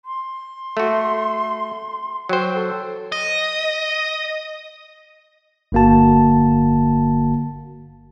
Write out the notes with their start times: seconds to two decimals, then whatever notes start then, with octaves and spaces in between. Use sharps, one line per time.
0.05 C6
0.77 A3 F#4
2.29 F#3 C5 G5
2.55 A4
3.12 D#5
5.72 G1 D3 A#3 F#4 A5